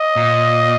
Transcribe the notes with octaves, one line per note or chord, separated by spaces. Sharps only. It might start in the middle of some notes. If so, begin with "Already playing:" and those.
Already playing: D#5
A#2